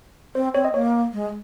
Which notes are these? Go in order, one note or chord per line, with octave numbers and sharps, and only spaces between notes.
C4 C5
C4 C#5
D#5
A#3 C#5
G#3